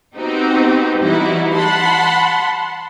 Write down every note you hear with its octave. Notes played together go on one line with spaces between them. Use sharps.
B3 C4 D#4 F#4 G4
E3 G3 D#4 E4 F#4
F#5 A5 B5 C6